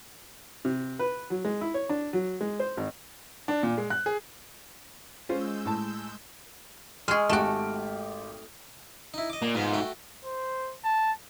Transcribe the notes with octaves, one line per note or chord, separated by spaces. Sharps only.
C3
B4
F#3
G#3
E4
C#5
D4
F#3
G#3
C5
G#1
D4
A#2
G#3
F#6
G#4
G#3 C#4 F4 C5 E6 G6
A2 A5
G#3 G#4 C#6 D#6 F6
G#1 A3 F#4 G4 D7
D#4 E4
D#5 D6
A#2
G#2 G#3 B3 F4
A3 F#4 G5
C5
A5